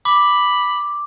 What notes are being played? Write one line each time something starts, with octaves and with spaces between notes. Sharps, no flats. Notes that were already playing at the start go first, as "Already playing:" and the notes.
B5 D6